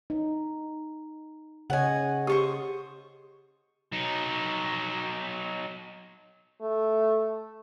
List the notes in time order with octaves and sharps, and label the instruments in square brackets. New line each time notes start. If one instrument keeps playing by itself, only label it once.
[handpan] D#4
[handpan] C#3 C#5 D#5 [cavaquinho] F#5 G#5
[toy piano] G4 [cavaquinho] C5 C#6 D#6
[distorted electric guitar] F#3 D#4
[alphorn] A3